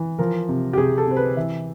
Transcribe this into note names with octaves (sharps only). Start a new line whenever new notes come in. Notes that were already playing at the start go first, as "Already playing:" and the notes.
Already playing: E3
F3 A#4
C3
G4
C3 G#4
A4
C3 C5
B4
E3 E5